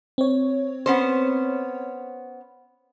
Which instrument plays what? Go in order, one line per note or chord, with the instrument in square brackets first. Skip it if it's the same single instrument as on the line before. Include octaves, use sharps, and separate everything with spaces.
[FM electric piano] C4 C#5
[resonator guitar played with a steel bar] B3 C#4 C5